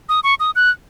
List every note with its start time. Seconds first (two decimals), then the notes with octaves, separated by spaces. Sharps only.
0.09 D#6
0.24 C#6
0.40 D#6
0.56 F#6